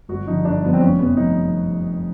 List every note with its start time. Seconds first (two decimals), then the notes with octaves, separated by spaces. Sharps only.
0.09 G1 F#4
0.27 G2 D3 F3 D#4
0.44 G1 D4
0.63 G2 D3 F3 B3
0.74 C4
0.80 F1 C#4
0.99 F2 C3 B3
1.17 F1 D#4